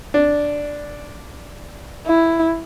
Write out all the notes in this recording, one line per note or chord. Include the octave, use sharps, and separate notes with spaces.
D4
E4